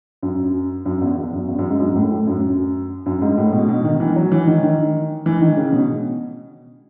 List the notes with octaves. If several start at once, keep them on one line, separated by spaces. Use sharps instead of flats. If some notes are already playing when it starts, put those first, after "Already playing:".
F#2
F#2
E2
E2
F#2
E2
F#2
G#2
F#2
A2
A2
F#2
F#2
G#2
A2
B2
B2
D#3
E3
F#3
E3
D#3
D#3
E3
D#3
C#3
B2